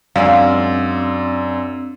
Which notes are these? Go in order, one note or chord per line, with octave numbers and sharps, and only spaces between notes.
F#2 G#3 C4 D4 F4 D5 F5 E6